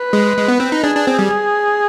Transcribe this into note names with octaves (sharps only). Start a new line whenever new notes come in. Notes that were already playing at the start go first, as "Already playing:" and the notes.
Already playing: B4
G#3
G#3
B3
C4
D#4
D4 G#4
D4
C4
G3